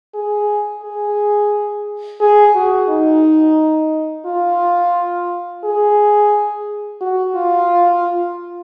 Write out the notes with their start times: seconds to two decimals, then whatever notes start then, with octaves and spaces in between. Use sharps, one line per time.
0.15 G#4
0.83 G#4
2.21 G#4
2.55 F#4
2.89 D#4
4.26 F4
5.64 G#4
7.01 F#4
7.35 F4